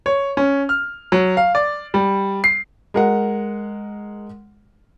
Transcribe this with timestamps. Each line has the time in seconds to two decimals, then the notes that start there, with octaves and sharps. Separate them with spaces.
0.06 C#5
0.37 C#4
0.69 F6
1.12 F#3
1.37 F5
1.55 D5
1.94 G3
2.44 C7
2.94 G#3 A#4 F#5